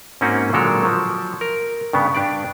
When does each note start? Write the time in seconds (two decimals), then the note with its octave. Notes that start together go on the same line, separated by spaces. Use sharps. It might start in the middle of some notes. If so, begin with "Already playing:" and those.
0.21 G#2 A#3 C4 C#4 D#4 F#4
0.53 A#2 D3 F#3 G#3 A4 A#4
0.83 F3 F#3
1.41 A#4
1.93 G2 C#3 B3
2.15 G2 D4 G4 D5